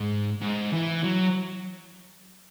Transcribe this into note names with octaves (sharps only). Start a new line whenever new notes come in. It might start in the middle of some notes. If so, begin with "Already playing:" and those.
Already playing: G#2
G#2
E3
F#3